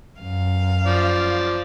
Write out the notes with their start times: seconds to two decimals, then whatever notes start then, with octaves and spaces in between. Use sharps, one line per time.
0.21 F#2 F5
0.86 F3 D5